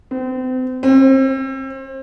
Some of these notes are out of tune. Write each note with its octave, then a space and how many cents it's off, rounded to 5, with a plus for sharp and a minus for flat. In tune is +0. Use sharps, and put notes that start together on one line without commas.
C4 -35
C4 +35